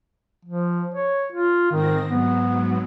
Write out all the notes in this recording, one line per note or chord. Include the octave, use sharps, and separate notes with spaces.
F3
C#5
F4
G#2 D#3 C4 A#6
G#2 F#3 B3